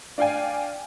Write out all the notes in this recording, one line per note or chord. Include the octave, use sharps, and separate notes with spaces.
D4 D5 F5 G5 G#5